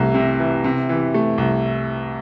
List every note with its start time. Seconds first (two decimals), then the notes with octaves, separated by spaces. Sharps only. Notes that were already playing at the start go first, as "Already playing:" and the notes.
Already playing: C2 C3 E3 A3
0.14 C3
0.40 E3
0.64 C3
0.89 E3
1.14 A3
1.38 C2